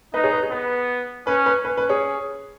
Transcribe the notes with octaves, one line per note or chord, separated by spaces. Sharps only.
D#4 B4 D#5
G#4 C#5
B4
G#4
B3 B4
C#4 B4
B4
C#4 B4
B4
G#4 C#5